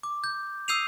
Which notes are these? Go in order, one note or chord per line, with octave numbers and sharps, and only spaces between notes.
D6
G6
D#6 E6 G6 C7 D#7 F7